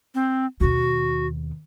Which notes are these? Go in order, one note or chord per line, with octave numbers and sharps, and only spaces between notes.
C4
D#2 B2 F#4